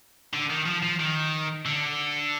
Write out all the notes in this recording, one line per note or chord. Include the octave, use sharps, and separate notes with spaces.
D3
D#3
F3
F3
D#3
D3